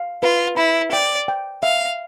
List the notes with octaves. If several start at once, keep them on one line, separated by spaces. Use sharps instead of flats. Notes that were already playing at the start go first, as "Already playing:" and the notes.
Already playing: F5
F4 B4
E4 B5
D5 G5
G5
E5 F5